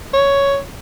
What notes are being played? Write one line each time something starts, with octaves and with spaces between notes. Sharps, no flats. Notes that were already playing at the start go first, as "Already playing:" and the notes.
C#5